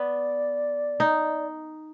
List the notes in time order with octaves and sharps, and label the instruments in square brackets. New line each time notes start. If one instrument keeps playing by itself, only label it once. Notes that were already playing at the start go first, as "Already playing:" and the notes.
Already playing: [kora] B3 [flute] D5
[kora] D#4